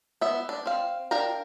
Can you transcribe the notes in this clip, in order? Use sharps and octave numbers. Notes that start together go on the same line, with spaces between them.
B3 E5
D4
C4 F5
D4 A#4 F5 G5 A#5